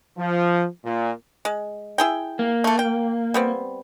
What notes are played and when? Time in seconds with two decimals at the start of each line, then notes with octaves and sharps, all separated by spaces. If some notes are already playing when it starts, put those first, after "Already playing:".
0.17 F3
0.84 A#2
1.45 G#3
1.98 E4 G#4 G5
2.39 A#3
2.64 A3 A4
2.79 G5
3.34 G3 B3 C4